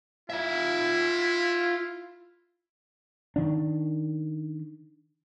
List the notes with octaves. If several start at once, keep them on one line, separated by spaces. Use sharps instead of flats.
E4 F4 E5
D#3 D4